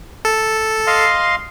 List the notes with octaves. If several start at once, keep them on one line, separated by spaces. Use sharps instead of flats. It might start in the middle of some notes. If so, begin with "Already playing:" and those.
A4
D#5 F5 C6